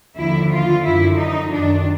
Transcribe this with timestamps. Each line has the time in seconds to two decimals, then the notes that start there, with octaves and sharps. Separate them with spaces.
0.17 D#2 D3 F3 E4
0.52 F4
0.85 F#2 D3 F3 E4
1.19 D#4
1.53 F#2 D#3 D4